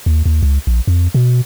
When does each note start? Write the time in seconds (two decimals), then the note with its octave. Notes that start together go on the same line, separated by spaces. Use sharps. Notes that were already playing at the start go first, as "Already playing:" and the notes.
0.06 D#2
0.25 D#2
0.43 C#2
0.67 A#1
0.87 F2
1.14 B2